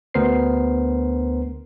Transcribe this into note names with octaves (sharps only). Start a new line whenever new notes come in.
D2 B3 A#4 C5 C7